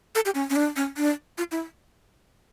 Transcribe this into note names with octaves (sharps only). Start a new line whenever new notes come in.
A4
G4
C#4
C#4
D4
C#4
D4
F4
E4